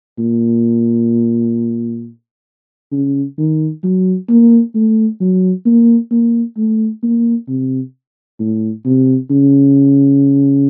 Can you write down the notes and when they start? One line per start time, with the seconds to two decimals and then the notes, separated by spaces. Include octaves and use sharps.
0.18 A#2
2.92 C#3
3.38 D#3
3.83 F#3
4.29 A#3
4.75 A3
5.21 F#3
5.65 A#3
6.11 A#3
6.57 A3
7.03 A#3
7.49 C3
8.39 A2
8.85 C3
9.30 C#3